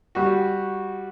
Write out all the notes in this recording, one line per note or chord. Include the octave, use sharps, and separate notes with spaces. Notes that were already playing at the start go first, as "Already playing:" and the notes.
G3 F#4